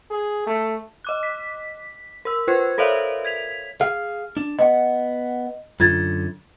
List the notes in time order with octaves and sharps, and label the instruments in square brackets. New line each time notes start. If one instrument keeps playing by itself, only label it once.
[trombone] G#4
A3
[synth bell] D#5 D6 F#6
B6
A#4 E6
F4 B4 C5 G#6
A4 A#4 C#5 D5 E5 F5
G#6 B6 F7
[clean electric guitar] G#4 F5 [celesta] F6
[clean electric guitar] D4
[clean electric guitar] B3 F#5 [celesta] D#5
[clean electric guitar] F#2 D3 [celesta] F4 G#6 A6